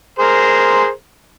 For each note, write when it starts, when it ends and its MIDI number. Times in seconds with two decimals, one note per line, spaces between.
0.19 0.89 68
0.19 0.89 70
0.19 0.89 72